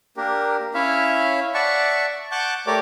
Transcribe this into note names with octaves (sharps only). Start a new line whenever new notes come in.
A#3 D4 G4 A#4
C#4 E4 C#5 E5 F5
D5 E5 F#5 A5 C#6
F#5 A5 C#6 D6 F#6 G6
A3 G4 A#4 C#5 D5 D6